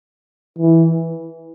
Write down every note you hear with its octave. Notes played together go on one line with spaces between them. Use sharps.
E3